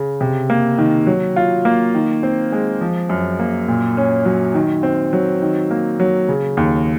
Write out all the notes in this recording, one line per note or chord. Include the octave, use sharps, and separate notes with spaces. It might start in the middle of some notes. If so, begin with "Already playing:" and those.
Already playing: C#3
C3
A#3
D#3
F#3
F4
A#3
D#3
C4
G#3
F3
F#2
A#3
A#2
C#4
F#3
D#3
C4
F#3
D#3
A#3
F#3
C#3
D#2